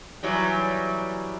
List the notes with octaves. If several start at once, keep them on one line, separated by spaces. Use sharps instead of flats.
E3 F#3 G3